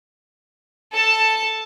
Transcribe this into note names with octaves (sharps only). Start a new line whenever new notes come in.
A4 A5